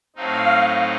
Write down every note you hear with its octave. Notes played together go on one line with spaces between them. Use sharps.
A2 F#3 A3 C4 D#4 F5